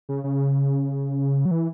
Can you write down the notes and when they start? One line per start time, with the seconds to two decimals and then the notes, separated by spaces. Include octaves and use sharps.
0.09 C#3
0.24 C#3
1.45 F#3
1.51 E3